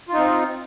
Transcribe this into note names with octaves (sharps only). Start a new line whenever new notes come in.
C4 D#4 F4